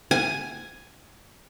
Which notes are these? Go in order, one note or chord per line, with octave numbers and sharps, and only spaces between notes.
G#5